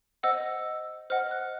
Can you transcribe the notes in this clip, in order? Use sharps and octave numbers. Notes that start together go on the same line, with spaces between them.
C5 D#5 F#5 E6
C5 D#5 F#5 F6
F#6